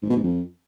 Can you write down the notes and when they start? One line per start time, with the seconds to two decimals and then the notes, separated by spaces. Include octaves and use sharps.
0.02 G#2
0.09 B2
0.16 G#2
0.23 F2